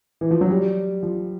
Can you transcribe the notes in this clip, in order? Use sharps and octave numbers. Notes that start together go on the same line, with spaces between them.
E3
F3
F#3
G3
F3